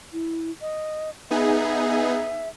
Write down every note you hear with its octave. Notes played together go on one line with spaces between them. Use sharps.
E4
D#5
B3 D#4 G#4 E5